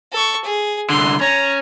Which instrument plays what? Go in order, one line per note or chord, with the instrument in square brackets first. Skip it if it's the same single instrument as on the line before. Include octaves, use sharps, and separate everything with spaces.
[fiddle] A4 C#6
G#4
[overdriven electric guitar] C2 D3 [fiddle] C6
[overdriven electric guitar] C#4 [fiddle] A#5